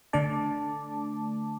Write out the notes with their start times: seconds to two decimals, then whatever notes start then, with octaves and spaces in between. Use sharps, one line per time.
0.13 D3 A3 D4 A5 D6